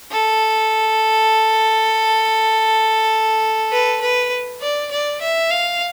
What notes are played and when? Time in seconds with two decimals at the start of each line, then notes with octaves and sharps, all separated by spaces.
0.11 A4
3.72 B4
4.01 B4
4.61 D5
4.91 D5
5.21 E5
5.51 F5